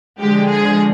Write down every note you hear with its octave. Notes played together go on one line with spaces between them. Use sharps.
D3 F3 G#3 G4
G#4